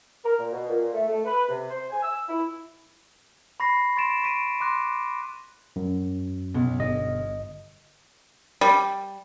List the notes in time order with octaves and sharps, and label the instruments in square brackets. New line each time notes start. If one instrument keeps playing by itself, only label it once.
[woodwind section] A#4
A#2
B2
A#2
A3
A3
B4
C3
C5
G#5
E6
E4
[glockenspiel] B5 C#6 A#6 C7
C6 C#6 A6 A#6 D7 E7
C#6 B6 D7 D#7
C6 D6 F#6 A#6
[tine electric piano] F#2
[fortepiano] B1
[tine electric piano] G1 D#5
[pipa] G3